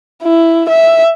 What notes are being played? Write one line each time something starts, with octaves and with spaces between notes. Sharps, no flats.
E4
E5